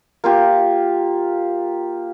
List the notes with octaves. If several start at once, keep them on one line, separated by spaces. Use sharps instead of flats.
A#3 F4 G4